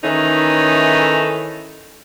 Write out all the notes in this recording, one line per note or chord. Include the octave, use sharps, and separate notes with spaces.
D#3 E3 A3 C#4 D#4 A4